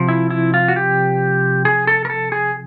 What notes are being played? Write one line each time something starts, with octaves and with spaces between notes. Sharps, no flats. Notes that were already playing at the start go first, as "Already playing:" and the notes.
Already playing: C3 F3
E4
E4
F4
F#4
G4
G#4
A4
A#4
A4
G#4